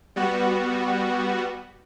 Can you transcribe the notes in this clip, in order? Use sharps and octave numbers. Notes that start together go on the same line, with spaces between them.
G3 B3 F#4